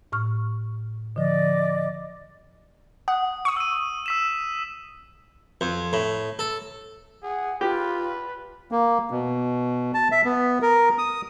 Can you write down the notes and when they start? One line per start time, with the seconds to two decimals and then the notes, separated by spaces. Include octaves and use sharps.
0.12 A2 C#6 F6
1.16 D3 F3 D5 D#5
3.08 F#5 D#6
3.45 C#6 D#6
3.57 E6 D#7
4.06 E6 B6 E7
5.61 F2
5.93 A2
6.39 A4
7.23 G#4 F#5
7.61 F4 G4 B4
8.72 A#3
9.11 B2
9.94 A5
10.12 E5
10.25 B3
10.62 A#4
10.98 D#6